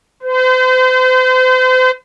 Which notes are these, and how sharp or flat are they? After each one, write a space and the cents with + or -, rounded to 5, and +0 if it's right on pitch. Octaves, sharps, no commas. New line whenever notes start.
C5 -40